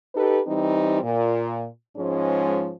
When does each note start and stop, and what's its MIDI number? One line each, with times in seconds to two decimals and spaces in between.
0.15 0.40 63
0.15 0.40 67
0.15 0.40 69
0.15 0.40 71
0.47 1.01 52
0.47 1.01 55
0.47 1.01 60
0.47 1.01 63
1.03 1.66 46
1.97 2.72 44
1.97 2.72 53
1.97 2.72 56
1.97 2.72 61